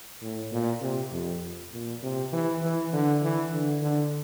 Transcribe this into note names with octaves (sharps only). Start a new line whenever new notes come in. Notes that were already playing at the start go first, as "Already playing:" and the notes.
A2
A#2
C3
F2
A#2
C3
E3
E3
D3
E3
D3
D3